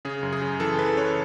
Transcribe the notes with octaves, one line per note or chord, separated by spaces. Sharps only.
C#3 G#4
F#2
G#4
C#3
E3 A4
C#3 B4
C#3 C#5